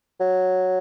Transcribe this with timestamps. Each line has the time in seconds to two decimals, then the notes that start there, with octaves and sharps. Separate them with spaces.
0.20 F#3